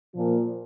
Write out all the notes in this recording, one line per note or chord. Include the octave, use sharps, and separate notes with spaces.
A#2 F3